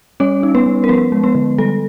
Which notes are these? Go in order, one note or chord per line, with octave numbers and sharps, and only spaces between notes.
G3 C#4 C#5
D#4
B3 B4
G3
A#4
F3 B3 B4
G#3
B3 B4
D3
G3 A4